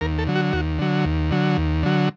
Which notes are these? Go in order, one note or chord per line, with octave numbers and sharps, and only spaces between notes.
D#2 A#4
A4
D3 F#3
F#4
D#2 F#4
D3 F#3
D#2
D3 F#3
D#2
D3 F#3